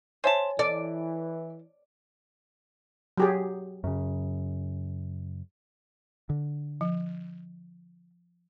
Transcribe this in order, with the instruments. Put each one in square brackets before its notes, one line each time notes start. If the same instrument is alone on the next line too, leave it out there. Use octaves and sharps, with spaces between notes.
[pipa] C5 E5 A5 [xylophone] C#5 G#5
[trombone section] E3 [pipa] A4 [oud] D5
[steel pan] F#3 G4 G#4
[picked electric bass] F#2 C#3
[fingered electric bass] D3
[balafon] F3